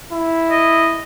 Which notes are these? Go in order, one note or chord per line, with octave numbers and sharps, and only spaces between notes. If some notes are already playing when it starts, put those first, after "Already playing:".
E4
D#5